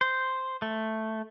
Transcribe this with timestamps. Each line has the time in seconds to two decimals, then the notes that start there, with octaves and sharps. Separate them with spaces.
0.01 C5
0.62 A3